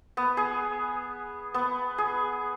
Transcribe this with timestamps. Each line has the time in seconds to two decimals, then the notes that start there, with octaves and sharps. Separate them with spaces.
0.17 B3
0.37 G#4
1.54 B3
1.98 G#4